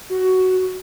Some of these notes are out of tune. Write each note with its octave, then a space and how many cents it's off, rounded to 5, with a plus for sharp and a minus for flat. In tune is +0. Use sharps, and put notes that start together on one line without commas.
F#4 +10